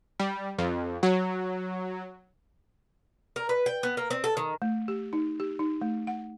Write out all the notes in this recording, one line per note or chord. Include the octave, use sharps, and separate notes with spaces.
G3
F2
F#3
A#4
B4
G5
B3
A#3
C4
A4
D#3
A3
G4
D#4
G4
D#4
A3
F#5